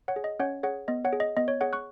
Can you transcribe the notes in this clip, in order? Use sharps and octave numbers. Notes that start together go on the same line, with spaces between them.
C#5 F#5
G#4
D#5
C#4 C#5 F#5
G#4 C#5 F#5
B3 D#5
C#5 F#5
G#4
D#5
B3 D#5
C#5
G#4 C#5 F#5
C#6 F#6